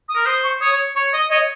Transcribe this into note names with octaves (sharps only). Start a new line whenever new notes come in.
D#6
A#4
C5 D#6
C#6
C#5 D#6
C#5
C#5 C#6
D#5
C#5 D#5